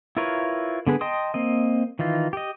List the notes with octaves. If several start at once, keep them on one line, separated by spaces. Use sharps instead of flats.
E4 F4 A#4 B4 C#5
D3 B3 G#4 B4
D#5 G5 A5 C6 D#6
A#3 C4 D#5
D#3 E3 D#4 F4
G4 D#5